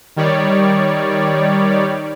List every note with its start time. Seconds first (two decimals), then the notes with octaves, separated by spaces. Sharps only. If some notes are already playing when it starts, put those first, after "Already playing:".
0.16 D#3 G3 C#5 D5